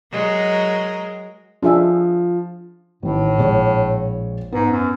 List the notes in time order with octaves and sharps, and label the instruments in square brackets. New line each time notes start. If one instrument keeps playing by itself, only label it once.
[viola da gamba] F#3 G#3 A#4
[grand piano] F3 [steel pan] D4 G#4 E5
[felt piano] A1 D#3 [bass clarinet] A2
[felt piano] A#1 G#3 C#5
[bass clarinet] G#2 [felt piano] B3
[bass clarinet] F#2